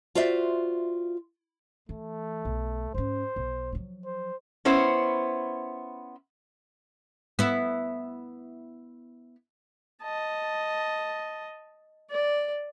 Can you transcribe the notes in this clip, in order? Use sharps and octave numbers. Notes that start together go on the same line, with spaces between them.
F4 F#4 C5 D5 E5
E3 A3
B1
G#2 C#4 C5
B1
F3 F#3
C5
B3 C#4 E4 C5
B3 E4
D#5 A5
D5